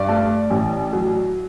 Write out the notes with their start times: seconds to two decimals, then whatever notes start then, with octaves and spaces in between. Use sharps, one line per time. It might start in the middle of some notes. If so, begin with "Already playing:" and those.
Already playing: G2 D5
0.08 A3
0.50 A1
0.93 F#3